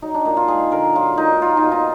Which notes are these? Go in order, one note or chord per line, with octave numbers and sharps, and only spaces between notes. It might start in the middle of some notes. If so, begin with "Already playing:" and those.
F#3 D#4
D4
A#2 D#4
F4
G#3 G#4
D3 A#4
F#3 F4
A#2 D#4
A#3 F4
D#4
B2
D#4